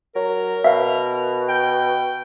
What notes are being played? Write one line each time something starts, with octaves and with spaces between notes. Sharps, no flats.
F#3 A#4
B2 E5 F5
G5